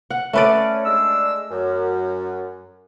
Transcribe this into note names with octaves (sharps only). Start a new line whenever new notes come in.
F#5
A3 C#4 B4 D5
G#3 D4 E6
F#2